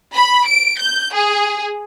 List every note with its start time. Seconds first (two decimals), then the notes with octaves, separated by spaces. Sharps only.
0.13 B5
0.45 D7
0.79 G6
1.14 G#4